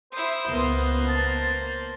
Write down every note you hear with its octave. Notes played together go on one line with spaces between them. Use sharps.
E4 C5 D#6
C#2 A#3 B3 C5 D#6
A5